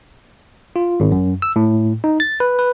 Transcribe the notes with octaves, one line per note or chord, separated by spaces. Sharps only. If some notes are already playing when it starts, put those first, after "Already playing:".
F4
G#1
F#2
E6
A2
D#4
A6
B4
B4